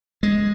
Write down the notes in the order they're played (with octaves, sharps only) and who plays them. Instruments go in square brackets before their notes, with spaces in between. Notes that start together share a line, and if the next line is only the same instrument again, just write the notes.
[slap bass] G#3